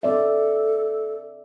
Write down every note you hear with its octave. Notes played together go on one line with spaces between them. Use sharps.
C4 A4 D5 E5